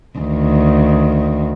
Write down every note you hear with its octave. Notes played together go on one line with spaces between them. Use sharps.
D2 D#3